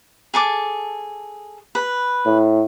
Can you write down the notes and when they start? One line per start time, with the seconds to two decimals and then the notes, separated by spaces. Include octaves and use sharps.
0.34 G#4 A4 D6
1.75 B4
2.26 A2